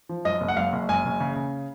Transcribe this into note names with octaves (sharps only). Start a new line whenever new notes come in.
F3
F#2 D#5
F#1
F#5
F#2 F5
F#1
F#2 G#5
F#1
C#3
C#3